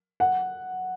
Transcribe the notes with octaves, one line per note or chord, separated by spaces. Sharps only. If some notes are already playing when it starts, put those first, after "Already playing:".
F#5